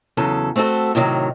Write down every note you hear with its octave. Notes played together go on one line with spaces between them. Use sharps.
E2 C#3 F#3 A4
A3 C4 F#4 G#4 A4
A2 C3 D#3 F3 F#3